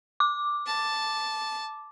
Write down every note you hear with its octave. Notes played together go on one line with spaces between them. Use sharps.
D6
A5